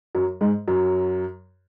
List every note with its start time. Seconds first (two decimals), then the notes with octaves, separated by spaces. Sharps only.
0.15 F#2 F#3
0.41 G#2 G#3
0.68 F#2 F#3